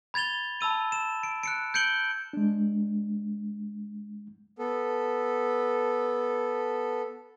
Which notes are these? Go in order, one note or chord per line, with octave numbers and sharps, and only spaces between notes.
B5 G#6 A6 F7 G7
A5 B5 E6 D#7
E7
D7
F#6 C#7 D7
G6 G#6 C#7 D7 F#7 G7
G#3 D4
B3 A4